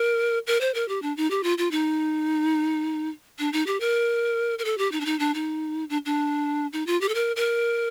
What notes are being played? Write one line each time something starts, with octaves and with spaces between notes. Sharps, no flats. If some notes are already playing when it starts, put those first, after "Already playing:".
Already playing: A#4
A#4
C5
A#4
G4
D4
D#4
G4
F4
F4
D#4
D4
D#4
G4
A#4
A#4
A4
G4
D#4
D4
D#4
D4
D#4
D4
D4
D#4
F4
G4
A4
A#4
A#4